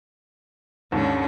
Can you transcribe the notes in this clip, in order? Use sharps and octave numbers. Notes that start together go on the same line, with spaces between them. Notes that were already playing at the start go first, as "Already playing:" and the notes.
D#2 G#2 D3 C#4